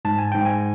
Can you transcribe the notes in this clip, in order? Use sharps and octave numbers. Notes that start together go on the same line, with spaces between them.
G#2 A5
G#5
G#2 G5
G#5